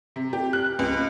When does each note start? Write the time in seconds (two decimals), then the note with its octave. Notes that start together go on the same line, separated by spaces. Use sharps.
0.16 C3
0.33 G4
0.53 F#6
0.79 C#2